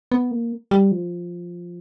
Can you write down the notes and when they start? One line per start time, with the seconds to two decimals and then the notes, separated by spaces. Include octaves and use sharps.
0.12 B3
0.31 A#3
0.71 G3
0.92 F3